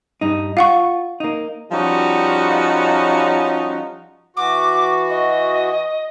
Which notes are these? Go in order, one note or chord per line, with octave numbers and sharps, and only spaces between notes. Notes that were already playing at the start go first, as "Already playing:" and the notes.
G2 D#4
F4 F5 F#5 C#6
A#3 D#4
F3 G3 C#4 D#4 F#4
E3 F#4 D6
D#5